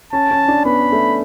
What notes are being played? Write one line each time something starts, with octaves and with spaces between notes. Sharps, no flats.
C#4 A5
C#4
D4
B3 B5
A3